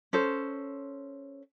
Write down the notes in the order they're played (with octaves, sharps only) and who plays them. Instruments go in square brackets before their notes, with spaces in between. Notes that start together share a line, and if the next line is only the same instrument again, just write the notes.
[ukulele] C#4 A4 C5